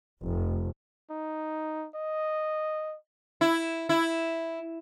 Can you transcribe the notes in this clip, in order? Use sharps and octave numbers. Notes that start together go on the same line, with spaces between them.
F1
D#4
D#5
E4
E4